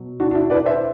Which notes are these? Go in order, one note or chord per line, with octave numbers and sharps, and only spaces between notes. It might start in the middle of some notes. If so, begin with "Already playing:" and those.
Already playing: B2 F#3
D4 F#4
D4
E4
B4 D5
C5 E5